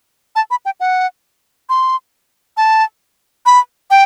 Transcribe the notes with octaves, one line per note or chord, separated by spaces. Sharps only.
A5
B5
G5
F#5
C6
A5
B5
G5